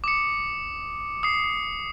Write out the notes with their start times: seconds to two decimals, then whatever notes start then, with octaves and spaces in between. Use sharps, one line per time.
0.04 D6 D#6 C#7
1.23 D#6 C7